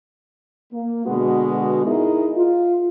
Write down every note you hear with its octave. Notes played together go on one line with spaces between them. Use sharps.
A#3
B2 D3 G#3 B3 F#4
D#4 E4 G#4 A#4 D#5
F4